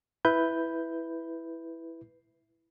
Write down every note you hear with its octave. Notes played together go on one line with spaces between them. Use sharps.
E4 B4 G6